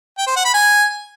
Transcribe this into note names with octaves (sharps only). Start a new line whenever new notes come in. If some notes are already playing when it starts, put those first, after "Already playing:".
G5
C5
F#5
B5
G#5